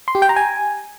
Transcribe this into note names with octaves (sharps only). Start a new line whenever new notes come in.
C6
G4
G5
A#5
G#5